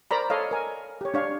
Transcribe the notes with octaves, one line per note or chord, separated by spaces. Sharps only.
A#4 C5 D5 A#5 B5
A4 C#5 D#5 F5
A#4 G#5
G4 C#5
D4 C#5 F5